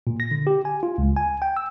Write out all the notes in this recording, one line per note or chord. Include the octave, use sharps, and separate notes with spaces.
A#2
A#6
D3
G4
G#5
F4
C#2
G#5
G5
E6